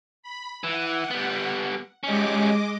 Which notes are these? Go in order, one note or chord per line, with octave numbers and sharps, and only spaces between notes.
B5
E3 F#5
G3 B3
G3 G#3 C#4 D#5 D6